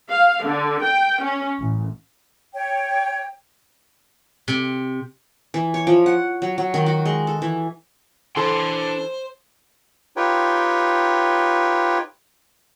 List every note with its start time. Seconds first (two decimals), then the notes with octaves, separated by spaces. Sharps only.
0.10 F5
0.45 D3
0.83 G5
1.23 C#4
1.60 A1
2.54 C#5 G5
4.48 C3
5.54 E3
5.74 C#5
5.87 F3
6.06 F#5
6.42 F#3
6.58 F#3
6.74 D#3
6.86 F#4
7.05 G#3
7.27 A4
7.42 E3
8.36 E3 D4 A4 C5 C6
10.17 D#4 F4 G4 B4 C#5 G5